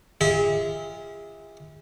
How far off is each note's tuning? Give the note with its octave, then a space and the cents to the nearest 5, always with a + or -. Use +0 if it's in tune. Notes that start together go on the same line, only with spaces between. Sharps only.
F4 -25 G#4 -35 E5 -40